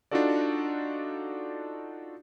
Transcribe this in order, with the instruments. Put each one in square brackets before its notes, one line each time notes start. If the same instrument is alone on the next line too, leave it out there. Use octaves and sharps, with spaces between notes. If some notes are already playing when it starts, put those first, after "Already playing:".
[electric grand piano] D4 D#4 F4 F#4 A4 D5